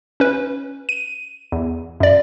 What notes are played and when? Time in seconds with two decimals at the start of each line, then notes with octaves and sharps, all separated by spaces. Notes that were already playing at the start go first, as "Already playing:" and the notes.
0.20 C#4 B4
0.89 D#7
1.52 E2
2.00 F#2 D5